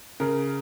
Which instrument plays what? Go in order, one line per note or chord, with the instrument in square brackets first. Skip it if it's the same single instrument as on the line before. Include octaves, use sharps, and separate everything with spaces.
[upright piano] C#3 A#4